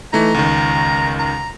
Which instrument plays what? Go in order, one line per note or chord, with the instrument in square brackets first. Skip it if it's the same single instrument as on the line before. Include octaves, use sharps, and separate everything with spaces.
[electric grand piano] E3 A3 D#4 [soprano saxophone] A#5
[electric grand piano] C#2 D#3
[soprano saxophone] A#5